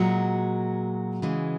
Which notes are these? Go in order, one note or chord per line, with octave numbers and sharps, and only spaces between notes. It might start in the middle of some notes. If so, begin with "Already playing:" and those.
Already playing: A#2 F#3 G#3 F#4
C#3 E3 G#3